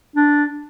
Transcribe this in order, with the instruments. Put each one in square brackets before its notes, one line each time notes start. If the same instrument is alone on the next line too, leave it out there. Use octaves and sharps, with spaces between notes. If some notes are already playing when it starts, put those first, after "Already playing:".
[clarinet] D4